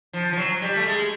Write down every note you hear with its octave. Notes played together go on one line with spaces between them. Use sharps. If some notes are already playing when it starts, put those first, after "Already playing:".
F3
F3
F#3
G3
A3
G#3